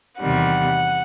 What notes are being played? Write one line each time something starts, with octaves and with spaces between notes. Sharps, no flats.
E2 C3 D#3 G3 F#5